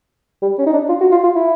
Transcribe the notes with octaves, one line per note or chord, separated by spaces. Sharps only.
G3
C#4
D#4
D4
F4
F#4
F4
F4
E4